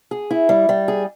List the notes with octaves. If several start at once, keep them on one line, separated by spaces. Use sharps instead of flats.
G#4
E4
G3
G3
G#4